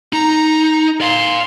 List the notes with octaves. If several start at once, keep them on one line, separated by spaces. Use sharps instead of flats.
D#4 A#5
D5 F5 C6